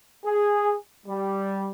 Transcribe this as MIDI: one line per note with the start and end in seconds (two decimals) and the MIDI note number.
0.24 0.75 68
1.06 1.71 55